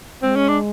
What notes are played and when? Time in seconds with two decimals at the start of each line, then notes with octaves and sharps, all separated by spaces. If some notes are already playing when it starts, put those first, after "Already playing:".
0.22 G#3 C4
0.36 C#4
0.48 D4